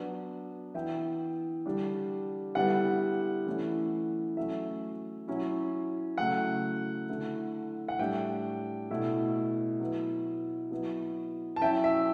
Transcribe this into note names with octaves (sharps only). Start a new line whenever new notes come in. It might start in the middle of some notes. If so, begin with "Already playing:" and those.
Already playing: F#3 B3 D4
E3 B3 E4 E5 G5
D3 G3 D4
D3 G3 B3 E4 F#5
E3 A3 C#4 E4
F#3 A3 C#4 E5
F#3 C#4 E4
C#3 F#3 A3 E4 F#5
D3 A3 E4
F#5
A2 G3 D4 E5 G5
B2 A3 E4
F#3 B3 E4
F#3 B3 E4
A5
F#3 C#4 E4 E5 G5
E5